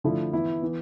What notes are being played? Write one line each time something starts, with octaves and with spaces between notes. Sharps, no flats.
D3 F3 A3 E4
E3 B3 E4
E3 B3